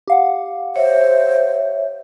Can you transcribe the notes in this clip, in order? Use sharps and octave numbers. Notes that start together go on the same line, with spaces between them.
G4 F5 F#5
C5 C#5 E5